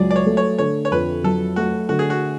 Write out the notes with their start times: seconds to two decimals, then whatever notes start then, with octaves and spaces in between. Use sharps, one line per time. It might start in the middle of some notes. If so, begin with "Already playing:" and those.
Already playing: C#2 F#3 G#4 D5
0.11 D5
0.16 C#5
0.26 A3
0.37 C#5
0.58 D3 C#5
0.85 C#5
0.91 F2 B4
1.24 F#3 A4
1.56 A3 F#4
1.89 D3 F#4
1.99 G#4
2.10 F#4